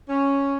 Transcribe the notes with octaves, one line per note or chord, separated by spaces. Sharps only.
C#4